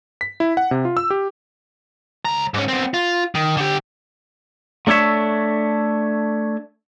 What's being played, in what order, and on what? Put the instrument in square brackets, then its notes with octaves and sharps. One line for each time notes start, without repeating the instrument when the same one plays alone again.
[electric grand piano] B6
E4
F#5
C3
F4
E6
G4
[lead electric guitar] C#2 A#5
G#2 C#4
B3 C4
F4
D#3
D3 G4
[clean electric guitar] A3 D4 A4 C#5 E5